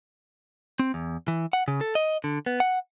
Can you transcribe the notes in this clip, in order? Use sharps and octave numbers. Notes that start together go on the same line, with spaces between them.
C4
E2
E3
F#5
C#3
A4
D#5
D3
B3
F#5